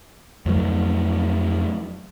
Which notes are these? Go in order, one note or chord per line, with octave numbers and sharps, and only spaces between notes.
F2 F#3 G3 A3